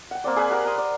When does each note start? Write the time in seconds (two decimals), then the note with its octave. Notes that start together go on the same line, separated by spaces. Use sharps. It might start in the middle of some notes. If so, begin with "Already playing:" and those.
0.11 F#5 G5
0.24 A#3 C4 D5
0.36 G#4 B4 G#5
0.50 G4 A#4 B4 F#5
0.65 A#5 C6 D#6
0.78 D5